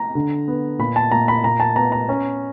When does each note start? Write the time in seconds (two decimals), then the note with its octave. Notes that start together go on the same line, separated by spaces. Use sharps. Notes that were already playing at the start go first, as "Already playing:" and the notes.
Already playing: A#5
0.15 D3
0.48 B3
0.79 A#2 B5
0.96 A5
1.12 A#2 A#5
1.28 B5
1.44 A#2 A#5
1.60 A5
1.76 B3 A#5
1.92 A#5
2.09 C#4